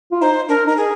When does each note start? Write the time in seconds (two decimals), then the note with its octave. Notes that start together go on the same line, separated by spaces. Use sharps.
0.12 F4
0.21 D#4 C5
0.49 D4 A#4
0.67 D#4 A#4
0.77 G#4